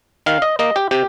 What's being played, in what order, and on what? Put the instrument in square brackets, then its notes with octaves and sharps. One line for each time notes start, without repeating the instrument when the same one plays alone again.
[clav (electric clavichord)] D#3 F5
D#5
A#3 D#5
G4
C3 G4